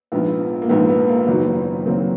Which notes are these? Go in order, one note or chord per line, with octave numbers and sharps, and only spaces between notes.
A#1 G#2 F3 B3
A#3
A#1 G#2 F3 B3
B3
A#3
F#1 F#2 D#3 F#3 B3
F#1 F#2 D#3 F#3 A#3 C4